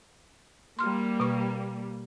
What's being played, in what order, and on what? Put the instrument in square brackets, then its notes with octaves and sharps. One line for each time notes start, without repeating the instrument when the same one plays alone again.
[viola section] G3 A#3 [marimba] C6 F6
[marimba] B2 C#6